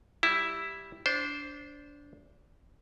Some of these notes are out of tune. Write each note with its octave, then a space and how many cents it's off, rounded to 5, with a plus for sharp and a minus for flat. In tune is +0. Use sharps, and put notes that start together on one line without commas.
G3 +0 E4 +0
D4 -20 C5 +0